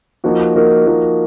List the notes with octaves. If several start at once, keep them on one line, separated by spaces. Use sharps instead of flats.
F3 A#3 D#4 F#4 A#4
F3 A#3 D#4 F#4 A#4
F3 A#3 D#4 F#4 A#4